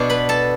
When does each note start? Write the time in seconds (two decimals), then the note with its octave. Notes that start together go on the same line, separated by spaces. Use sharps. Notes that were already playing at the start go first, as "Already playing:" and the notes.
Already playing: B2 B3 D4
0.10 B4 B5
0.29 A4 A5